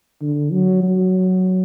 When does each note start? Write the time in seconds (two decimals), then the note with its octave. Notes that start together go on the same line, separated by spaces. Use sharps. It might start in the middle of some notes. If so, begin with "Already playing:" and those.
0.22 D3
0.52 F#3
0.83 F#3